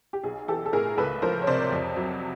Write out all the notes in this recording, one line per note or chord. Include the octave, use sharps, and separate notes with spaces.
G4
B1 G#4
E3 G4 A4
A4
A2 G#4 A#4
C#2 A4 B4
F3 A#4 C5
C#5
C3 C5 D5
F2
F#3